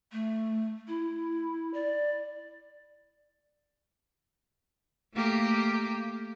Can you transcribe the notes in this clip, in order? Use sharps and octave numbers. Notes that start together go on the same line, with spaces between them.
A3
E4
D5
A3 A#3 G4